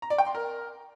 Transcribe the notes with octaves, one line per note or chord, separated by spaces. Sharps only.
A#5
D5
G5
C6
A#4